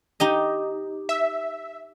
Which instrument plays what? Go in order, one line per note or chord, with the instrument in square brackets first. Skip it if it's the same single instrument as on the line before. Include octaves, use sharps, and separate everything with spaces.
[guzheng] D#4 G4 D#5
[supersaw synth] E5